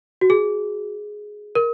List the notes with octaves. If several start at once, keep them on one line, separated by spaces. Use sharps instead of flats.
F#4
G#4
A#4